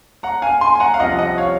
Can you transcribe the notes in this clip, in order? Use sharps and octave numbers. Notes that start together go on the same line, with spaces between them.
F#5 A#5
F5 G#5
G#5 C6
G#5
F#5 A#5
F5
C2 C3 F3 D#5 F#5
D#5 F#5
C#5 F5